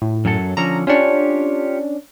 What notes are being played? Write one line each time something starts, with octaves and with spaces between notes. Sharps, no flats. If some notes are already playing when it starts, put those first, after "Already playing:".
A2
F#2 F#3 A4
D3 F3 C#4 A#5
C#4 D4 F4 G4 C#5